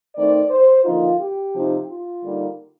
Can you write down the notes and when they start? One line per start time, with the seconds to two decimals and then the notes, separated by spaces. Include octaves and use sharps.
0.16 D#3 A3 C4 D#4 D5
0.50 C5
0.85 D3 F3 A#3 D#4 F4
1.20 G4
1.54 C3 F3 C4 D#4
1.88 F4
2.22 D3 G3 A#3 D#4